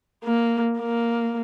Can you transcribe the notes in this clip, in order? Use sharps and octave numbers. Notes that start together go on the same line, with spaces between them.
A#3
A#3